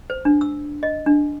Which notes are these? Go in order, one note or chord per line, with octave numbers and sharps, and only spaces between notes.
C5
D4
E6
D#5
D4